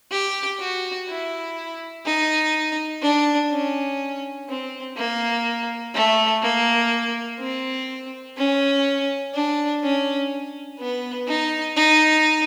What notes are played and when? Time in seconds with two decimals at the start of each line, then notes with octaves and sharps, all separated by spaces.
0.11 G4
0.60 F#4
1.08 E4
2.06 D#4
3.02 D4
3.51 C#4
4.48 C4
4.96 A#3
5.94 A3
6.42 A#3
7.40 C4
8.37 C#4
9.34 D4
9.83 C#4
10.79 B3
11.28 D#4
11.76 D#4